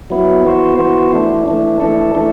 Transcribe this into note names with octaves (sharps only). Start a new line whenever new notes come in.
F#3 B3 E4
E3 B3 F#4 C5
E3 B3 F#4 C5
E3 A3 D4
E3 A3 D4
E3 A3 D4 A4
E3 A3 D4 A4